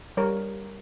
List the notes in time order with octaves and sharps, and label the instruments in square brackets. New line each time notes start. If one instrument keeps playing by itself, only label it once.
[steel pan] G3 A#4 C#5